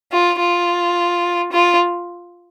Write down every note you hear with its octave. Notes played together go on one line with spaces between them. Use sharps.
F4
F4
F4